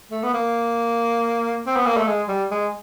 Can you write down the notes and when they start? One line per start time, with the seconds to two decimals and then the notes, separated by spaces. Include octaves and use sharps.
0.11 A3
0.23 B3
0.34 A#3
1.67 C4
1.76 B3
1.86 A#3
1.97 A3
2.07 G#3
2.28 G3
2.51 G#3